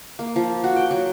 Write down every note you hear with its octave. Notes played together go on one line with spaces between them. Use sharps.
A#3
F3
F#4
G5
F#3